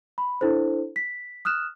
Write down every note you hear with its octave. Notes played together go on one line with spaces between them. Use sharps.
B5
D4 E4 A4 C5
B6
D#6 F6 F#6 E7